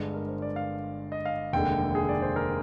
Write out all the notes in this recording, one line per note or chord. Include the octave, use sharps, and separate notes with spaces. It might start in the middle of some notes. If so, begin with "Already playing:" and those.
Already playing: G1 G2 D3 G#3
A#4
C5
D5
F5
D#5
F5
F1 D#2 D3 G#3 G5
G#4
D5
C5
A#4